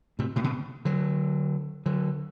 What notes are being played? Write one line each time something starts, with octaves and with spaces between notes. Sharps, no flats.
A2 C3
A2 C3
B2 D3
D3 F#3
D3 F#3